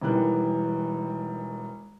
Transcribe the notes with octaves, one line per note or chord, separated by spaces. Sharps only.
E1 D#3 E3 G3 F#6